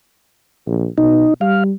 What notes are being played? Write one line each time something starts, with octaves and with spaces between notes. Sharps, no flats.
A#1
B2 D#4
G3 F5